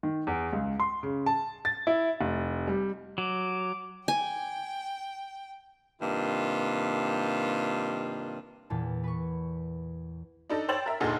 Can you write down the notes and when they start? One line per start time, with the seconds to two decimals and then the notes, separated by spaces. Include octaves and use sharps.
0.03 D#3
0.27 E2
0.53 C#2
0.80 C6
1.03 C#3
1.26 A5
1.65 A6
1.87 E4
2.21 F1
2.67 G3
3.18 F#3 D6
4.08 G5 G#5
6.02 G2 C3 D#3 A#3 F4
8.70 E2 A#2 A5
9.04 B4 C#6
10.49 D4 D#4 A4
10.69 C5 C#5 G5 E6 A6 F#7
10.86 A#4 E5
11.00 F1 D2 A#2 D#4 G#4 A4